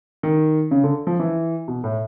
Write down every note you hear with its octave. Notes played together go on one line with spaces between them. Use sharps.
D#3
C#3
D3
F3
E3
B2
A2